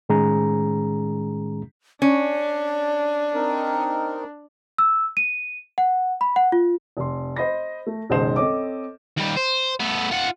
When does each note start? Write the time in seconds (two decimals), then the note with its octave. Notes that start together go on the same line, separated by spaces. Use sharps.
0.09 A2 D#3 G#3 C#4 G#4 A#5
2.02 C#4 D4 D5
3.34 C4 D#4 A#4
4.78 E6
5.17 D#7
5.78 F#5
6.21 B5
6.36 F#5
6.52 F4
6.97 F1 C6
7.36 C5 D#5 B5 A#6
7.87 A3
8.10 F#1 B1 D#3 G#3 C5 E7
8.36 C4 A4 C#5 D#5 D6
9.17 D#2 G3
9.37 C5
9.80 A3 B3
10.11 F4 F#5